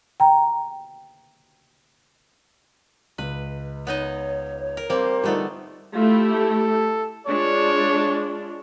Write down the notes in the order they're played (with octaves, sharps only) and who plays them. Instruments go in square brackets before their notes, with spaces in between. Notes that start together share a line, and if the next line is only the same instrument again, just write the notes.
[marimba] G5 A#5
[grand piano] C#2 [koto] B4
[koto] B3 D#4 D#5 [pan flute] C#5
[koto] A#4
[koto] G3 A#3 [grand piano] C4 [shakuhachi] C5
[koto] D3 A3 B3 [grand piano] G3 D#4 [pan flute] F4
[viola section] A3 E4 G4 [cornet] F4
[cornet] A4
[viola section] G#3 D4 F4 [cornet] C#5